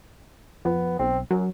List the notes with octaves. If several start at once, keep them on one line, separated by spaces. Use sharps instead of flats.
F2 B3
B1 C4
F#2 F#3